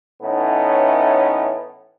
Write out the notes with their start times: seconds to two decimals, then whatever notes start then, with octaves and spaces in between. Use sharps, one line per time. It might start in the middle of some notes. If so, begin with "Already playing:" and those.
0.22 A2 E3 B3 C#4 D#4